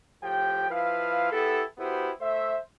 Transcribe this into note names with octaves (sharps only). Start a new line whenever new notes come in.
A2 F3 G4 G5
F3 E4 B4 F5
B3 E4 G4 A4
B3 E4 F#4 G4 C5
A3 C5 E5